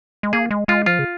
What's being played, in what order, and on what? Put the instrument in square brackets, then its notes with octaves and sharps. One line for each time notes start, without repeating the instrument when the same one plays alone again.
[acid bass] G#3
[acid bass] A#3 [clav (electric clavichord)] G#4
[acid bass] G#3
[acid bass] G#3 [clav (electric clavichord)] F4
[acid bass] F3 [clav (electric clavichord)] F4
[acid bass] C#3